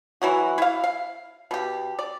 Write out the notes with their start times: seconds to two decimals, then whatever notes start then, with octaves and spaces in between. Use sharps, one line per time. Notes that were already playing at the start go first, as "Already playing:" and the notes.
0.22 E3 F#3 F#4
0.58 E4 F5
0.84 F5
1.51 B2 G4
1.99 D5